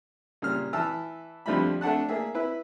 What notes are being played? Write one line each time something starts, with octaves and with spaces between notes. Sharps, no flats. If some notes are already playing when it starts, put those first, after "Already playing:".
A#2 C#3 G3 F6
E3 E5 A5 E6 F6
F2 D3 F3 G3 E5 B5
A3 D4 F#5 A5 F#6
A#3 G#4 E5
E4 B4 E5